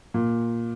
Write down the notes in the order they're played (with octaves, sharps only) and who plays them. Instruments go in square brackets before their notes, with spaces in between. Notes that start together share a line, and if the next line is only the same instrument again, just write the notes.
[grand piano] A#2